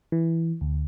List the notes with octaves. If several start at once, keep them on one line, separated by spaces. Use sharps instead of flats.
E3
D2